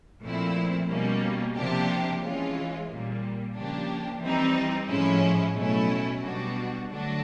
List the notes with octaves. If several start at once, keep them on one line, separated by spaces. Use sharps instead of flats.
A#2 F3 A3 C4 E4
B2 G3 A#3 C#4
C3 F3 A#3 D4 G4
E3 G#3 C#4 F4
A#2 G3 A#3
C#3 F3 A#3 D4 G4
E3 G3 C4 D#4
A2 F3 G#3 C#4 E4
B2 F#3 A3 C#4 E4
B2 G3 B3 D4 F#4
D3 F#3 A3 D4 F#4